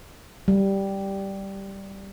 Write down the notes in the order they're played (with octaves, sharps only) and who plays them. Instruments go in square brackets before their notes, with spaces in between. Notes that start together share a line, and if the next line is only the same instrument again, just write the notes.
[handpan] G3